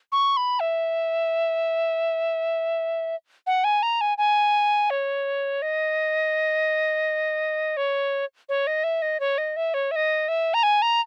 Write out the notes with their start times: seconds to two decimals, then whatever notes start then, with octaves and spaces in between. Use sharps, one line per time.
0.12 C#6
0.37 B5
0.60 E5
3.47 F#5
3.64 G#5
3.83 A#5
4.01 G#5
4.18 G#5
4.90 C#5
5.62 D#5
7.77 C#5
8.49 C#5
8.67 D#5
8.84 E5
9.02 D#5
9.20 C#5
9.38 D#5
9.56 E5
9.74 C#5
9.91 E5
9.96 D#5
10.28 E5
10.54 A#5
10.63 G#5
10.82 A#5